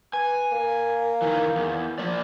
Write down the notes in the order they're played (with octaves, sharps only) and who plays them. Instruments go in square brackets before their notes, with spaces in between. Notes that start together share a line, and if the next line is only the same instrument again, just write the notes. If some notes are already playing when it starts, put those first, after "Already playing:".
[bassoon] B4 [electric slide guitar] G#5
[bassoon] A#3
[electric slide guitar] D#3 E3
E2
F3 A#3 D5